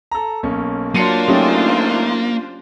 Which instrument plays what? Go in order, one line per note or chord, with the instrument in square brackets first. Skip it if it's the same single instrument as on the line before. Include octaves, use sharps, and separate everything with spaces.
[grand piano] A4 A#5
B1 A#3 C#4
[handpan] F#3 [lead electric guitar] A#3 [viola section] D4 F4 C5 [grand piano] A5 C#7 D#7
[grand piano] F#3 A3 D#4 [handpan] C#4 G4